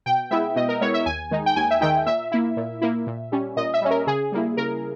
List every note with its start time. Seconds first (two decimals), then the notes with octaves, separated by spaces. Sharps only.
0.06 B2 G5
0.31 G#3 B3 E4 E5
0.56 B2 D#5
0.69 A#4
0.81 G#3 B3 E4 C#5
0.94 E5
1.06 D#2 G#5
1.31 D#3 G#3 D#4
1.46 G5
1.56 D#2 G#5
1.71 E5
1.81 D#3 G#3 D#4 G5
2.06 A#2 E5
2.32 A#3 E4
2.57 A#2
2.82 A#3 E4
3.07 A#2
3.32 G3 C#4
3.57 A#2 D#5
3.74 E5
3.82 G3 C#4
3.91 A#4
4.07 C#3 G#4
4.32 G3 A#3 E4
4.57 C#3 A#4